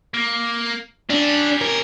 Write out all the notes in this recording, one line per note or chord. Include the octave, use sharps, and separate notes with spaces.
A#3
C#4 D4 G4
A#4